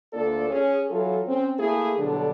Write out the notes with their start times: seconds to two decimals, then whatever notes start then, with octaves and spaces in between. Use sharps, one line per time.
0.13 D2 A#3 D4 F4 A4 D5
0.49 C#4 G#4
0.89 E3 F#3 F4 A4
1.26 C4 C#4
1.59 A3 A#3 E4 G#4
1.98 B2 D3 F#3 G3 D4 A4